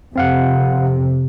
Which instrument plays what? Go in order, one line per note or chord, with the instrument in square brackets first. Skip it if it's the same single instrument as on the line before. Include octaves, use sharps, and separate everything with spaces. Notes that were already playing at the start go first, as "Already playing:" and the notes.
[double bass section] F2 C3 [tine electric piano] C4 F5 F#5